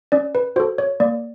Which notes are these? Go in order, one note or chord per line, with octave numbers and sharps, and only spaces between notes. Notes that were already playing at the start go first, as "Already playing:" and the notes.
C#4 D5
B4
F#4 A4 C5
C#5
A#3 D5